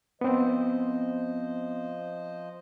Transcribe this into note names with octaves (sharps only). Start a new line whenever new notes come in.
F3 B3 C4 C5 D#5